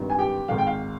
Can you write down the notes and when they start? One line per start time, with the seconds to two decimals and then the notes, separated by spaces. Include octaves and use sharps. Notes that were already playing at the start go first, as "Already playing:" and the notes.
Already playing: G#1 G2 D#3
0.09 G#5
0.18 G4 G5
0.48 G#1 G#2 D#3 F5
0.58 G5
0.67 F5